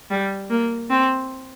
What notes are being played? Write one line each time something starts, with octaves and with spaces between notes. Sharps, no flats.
G3
A#3
C4